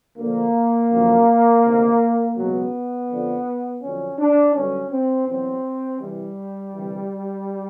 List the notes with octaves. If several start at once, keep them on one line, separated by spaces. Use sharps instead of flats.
D2 D3 F3 A#3
F#2 D3 F3
D2 C3 D#3
C#2 B2 F#3 B3
F2 D3 F3
F2 D3 F#3 C#4
D4
G2 D3 F#3 C#4
C4
E2 B2 F#3 C4
C2 C3 E3 G3
D2 C3 E3